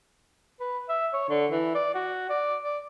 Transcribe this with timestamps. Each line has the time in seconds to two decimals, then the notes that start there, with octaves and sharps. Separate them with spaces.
0.60 B4
0.89 E5
1.13 C#5
1.29 D3
1.50 E3
1.75 D5
1.95 F#4
2.29 D5
2.62 D5